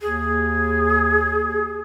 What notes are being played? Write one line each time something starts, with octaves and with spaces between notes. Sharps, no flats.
D#2 G#4